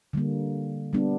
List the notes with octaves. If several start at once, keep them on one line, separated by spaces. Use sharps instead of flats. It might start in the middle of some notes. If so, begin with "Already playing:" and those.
D3 G3 A#3
G3 B3 D4